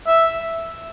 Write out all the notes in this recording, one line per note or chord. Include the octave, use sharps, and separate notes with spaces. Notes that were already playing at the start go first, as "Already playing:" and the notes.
E5